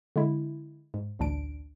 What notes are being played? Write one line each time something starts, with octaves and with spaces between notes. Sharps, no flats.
D3 G#3 E4
G#2
A1 D2 D4 D7